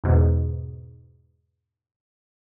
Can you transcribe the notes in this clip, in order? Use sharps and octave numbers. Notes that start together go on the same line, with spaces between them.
E2 G#2 B2